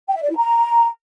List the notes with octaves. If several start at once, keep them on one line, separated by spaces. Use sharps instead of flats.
G5
E5
D5
E4
A#5